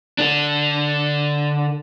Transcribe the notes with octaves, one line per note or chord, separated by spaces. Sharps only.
D3 D4